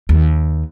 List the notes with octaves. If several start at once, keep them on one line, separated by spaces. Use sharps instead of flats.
D#2